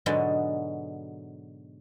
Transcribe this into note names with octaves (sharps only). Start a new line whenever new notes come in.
G#2 B2 D3 F#3 G#3 B3